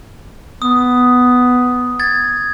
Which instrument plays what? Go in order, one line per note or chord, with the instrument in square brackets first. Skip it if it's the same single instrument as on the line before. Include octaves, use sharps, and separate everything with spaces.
[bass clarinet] B3 [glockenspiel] D#6
[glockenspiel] G#6 A6